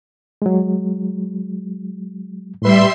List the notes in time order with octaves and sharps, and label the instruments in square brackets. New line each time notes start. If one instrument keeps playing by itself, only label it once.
[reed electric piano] F#3 G#3
[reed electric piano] A2 B4 [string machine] G3 E5 C6